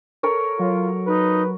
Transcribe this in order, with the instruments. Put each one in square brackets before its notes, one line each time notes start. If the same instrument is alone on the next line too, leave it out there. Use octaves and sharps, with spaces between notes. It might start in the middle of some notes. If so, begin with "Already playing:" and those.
[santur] A4 A#4 C#5
[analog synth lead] F#3 [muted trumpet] F4
[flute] D#4 [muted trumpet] B4